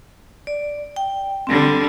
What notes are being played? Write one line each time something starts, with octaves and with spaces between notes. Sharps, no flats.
D5
G5
D3 G3 C4